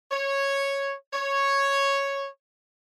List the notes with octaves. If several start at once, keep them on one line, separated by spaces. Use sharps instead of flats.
C#5
C#5